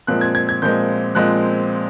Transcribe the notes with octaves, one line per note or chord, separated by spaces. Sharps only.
A#2 F3 G#3 C4 F#6
G#6
G#6
G#6
A#2 F3 G#3 C4 G6
A#2 F3 G#3 C4 F#6